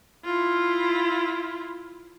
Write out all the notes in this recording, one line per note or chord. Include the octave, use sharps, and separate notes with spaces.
E4 F4